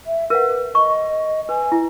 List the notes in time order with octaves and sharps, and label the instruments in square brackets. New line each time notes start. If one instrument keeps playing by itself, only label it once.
[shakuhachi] E5
[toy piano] A#4 F5 F#5 [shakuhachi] B4
[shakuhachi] D#5 [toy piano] C#6
[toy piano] B4 [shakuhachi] G#5
[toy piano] E4